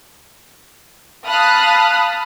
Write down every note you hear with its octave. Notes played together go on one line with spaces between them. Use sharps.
F5 A5 B5 D#6 F6 F#6